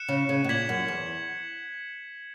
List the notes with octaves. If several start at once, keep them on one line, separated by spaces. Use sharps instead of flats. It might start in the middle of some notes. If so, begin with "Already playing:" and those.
Already playing: F#6 C#7 E7
C#3
C#3
B2
A#2 G#6 B6 F#7
F#2
E2